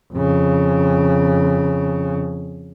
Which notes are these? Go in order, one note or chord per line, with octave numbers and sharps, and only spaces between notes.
F2 C#3